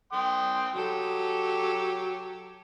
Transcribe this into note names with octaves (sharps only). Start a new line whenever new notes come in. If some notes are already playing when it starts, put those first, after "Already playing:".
G5 C6 D#6
F#3 G4 A4